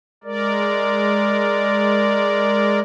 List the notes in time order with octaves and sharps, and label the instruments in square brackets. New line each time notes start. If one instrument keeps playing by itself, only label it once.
[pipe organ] G#3 A#4 D5